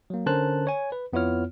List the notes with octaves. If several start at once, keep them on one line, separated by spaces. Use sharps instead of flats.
F#3 A#3
D3 C#4 A#4 C5 A5 F#6
C#5 G#5
B4
F2 B3 E4 F4 C#5 F6